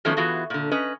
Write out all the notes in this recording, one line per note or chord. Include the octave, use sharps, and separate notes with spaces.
D#3 F3 F#3 A3 B3 C#4
E3 B3 F4 F#4 G#4
A#2 D3
C#4 B4 D#5